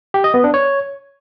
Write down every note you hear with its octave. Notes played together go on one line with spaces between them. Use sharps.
G4
D#5
B3
D4
C#5